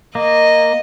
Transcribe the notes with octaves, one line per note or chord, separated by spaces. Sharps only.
A#3 D#5